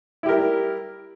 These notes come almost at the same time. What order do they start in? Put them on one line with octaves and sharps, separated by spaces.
E4 G4 A#4 G3